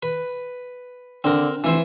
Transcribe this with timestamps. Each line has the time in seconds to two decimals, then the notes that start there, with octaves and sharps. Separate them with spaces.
0.03 B4
1.24 D3 C4 A#4
1.64 F1 E3 E4 C5